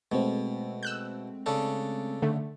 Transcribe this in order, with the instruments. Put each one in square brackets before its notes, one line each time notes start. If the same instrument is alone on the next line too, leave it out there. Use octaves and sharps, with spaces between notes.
[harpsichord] B2 [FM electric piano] G#3 A3 C4
[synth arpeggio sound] E6 F#6 G6
[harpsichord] C#3 D4 A4
[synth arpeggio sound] D3 A3